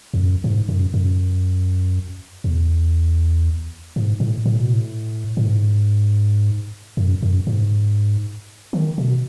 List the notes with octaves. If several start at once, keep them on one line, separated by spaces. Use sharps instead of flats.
E2
F#2
G#2
F#2
F#2
E2
G#2
A2
A2
B2
A2
A2
G#2
F#2
F#2
G#2
D#3
B2